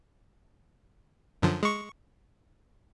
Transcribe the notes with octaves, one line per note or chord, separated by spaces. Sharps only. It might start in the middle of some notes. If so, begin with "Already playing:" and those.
F#2 D3 F3
G#3 C#6